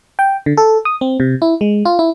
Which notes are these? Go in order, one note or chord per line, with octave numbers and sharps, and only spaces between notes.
G5
D3
A4
D#6
C4
C3
E4
G#3
F4
E4